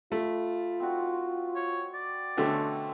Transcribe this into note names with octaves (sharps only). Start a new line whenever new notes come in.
A3 F4 B5
C4 D#4 F#4
C#5
D5
B2 D3 A3 C4 C#4 C#5